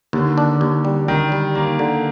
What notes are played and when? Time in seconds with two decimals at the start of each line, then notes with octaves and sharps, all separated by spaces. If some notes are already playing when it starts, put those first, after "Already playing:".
0.13 D#2 D3
0.38 D4
0.61 D#2
0.85 G3
1.08 D#3 G3
1.32 G3
1.55 D#2 A#3
1.79 D3